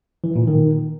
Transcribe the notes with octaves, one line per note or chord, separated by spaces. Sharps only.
E3
A#2
D#3